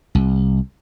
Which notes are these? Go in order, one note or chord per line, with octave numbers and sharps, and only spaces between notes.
C2